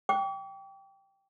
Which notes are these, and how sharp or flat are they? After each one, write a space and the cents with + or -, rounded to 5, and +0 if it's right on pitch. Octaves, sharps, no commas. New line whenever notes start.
G5 +0 D6 -45